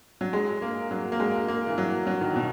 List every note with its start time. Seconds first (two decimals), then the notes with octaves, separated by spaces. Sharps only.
0.21 F#3
0.33 G#3
0.62 A#3
0.91 F#3
1.12 A#3
1.20 G#3
1.48 A#3
1.67 E3
1.78 F#3
2.07 F#3
2.21 D#3
2.36 B2